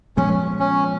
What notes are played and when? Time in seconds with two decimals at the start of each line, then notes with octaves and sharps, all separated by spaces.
0.17 A#2 F3 G#3 B3 C#4
0.59 C#4